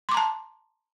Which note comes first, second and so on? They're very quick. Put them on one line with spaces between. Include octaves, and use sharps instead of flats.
C6 D6 A#5 A5